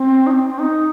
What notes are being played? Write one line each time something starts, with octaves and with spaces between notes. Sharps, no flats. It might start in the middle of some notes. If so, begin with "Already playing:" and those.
Already playing: C4
D#4
C4
C4
D#4